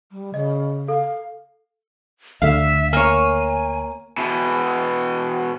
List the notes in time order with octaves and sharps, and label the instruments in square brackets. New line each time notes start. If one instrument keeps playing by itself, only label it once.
[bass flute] G3
[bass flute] C#3 [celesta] D#5
[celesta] A4 [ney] F5
[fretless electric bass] D2 D3 [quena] E5 [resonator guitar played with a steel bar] F5
[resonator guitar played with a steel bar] A#3 C#5 [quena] G#5
[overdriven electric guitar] B2 E3